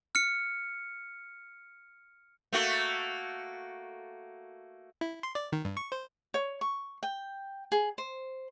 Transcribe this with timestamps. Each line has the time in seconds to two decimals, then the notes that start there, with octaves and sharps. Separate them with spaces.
0.15 F6 C#7
2.52 A3 A#3 F#4
5.01 E4
5.23 C6
5.35 D5
5.52 D#3
5.65 G2
5.77 C#6
5.92 C5
6.34 C#5
6.61 C#6
7.03 G5
7.72 G#4
7.98 C5